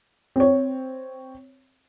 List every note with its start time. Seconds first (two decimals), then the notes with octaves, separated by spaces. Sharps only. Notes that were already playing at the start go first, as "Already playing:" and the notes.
0.36 C4 C#5